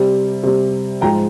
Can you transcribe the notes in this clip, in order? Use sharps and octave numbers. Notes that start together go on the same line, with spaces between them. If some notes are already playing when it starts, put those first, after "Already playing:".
Already playing: C3 G3
C3 G3
G#2 F3 G#3 G5 A#5